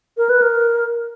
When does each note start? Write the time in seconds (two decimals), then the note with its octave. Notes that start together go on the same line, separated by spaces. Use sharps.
0.17 A#4
0.29 B4
0.42 A#4